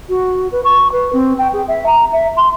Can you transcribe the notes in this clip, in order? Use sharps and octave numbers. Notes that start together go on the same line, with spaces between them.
F#4
B4
C#6
B4
C4
G5
G#4
E5
A#5
E5
C6